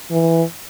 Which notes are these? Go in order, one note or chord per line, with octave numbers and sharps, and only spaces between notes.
E3